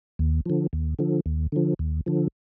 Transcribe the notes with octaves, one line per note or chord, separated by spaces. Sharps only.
D#2
D3 F3
D#2
D3 F3
D#2
D3 F3
D#2
D3 F3